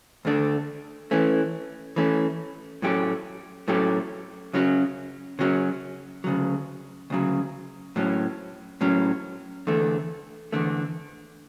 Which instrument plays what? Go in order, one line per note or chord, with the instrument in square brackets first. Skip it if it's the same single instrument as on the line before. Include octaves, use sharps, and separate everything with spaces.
[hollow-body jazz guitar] D2 D3 A3 D4
E3 A3 C#4
E3 A3 C#4
A2 F#3 A3 C#4 G4
A2 F#3 A3 C#4 G4
C#3 F#3 C#4 F#4
C#3 F#3 C#4 F#4
D2 C#3 F#3
D2 C#3 F#3
A2 F#3 C#4
A2 F#3 C#4
E2 D3 A3
E2 D3 A3